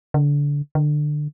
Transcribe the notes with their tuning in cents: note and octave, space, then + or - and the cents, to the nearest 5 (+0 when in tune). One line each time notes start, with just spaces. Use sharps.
D3 -25
D3 +20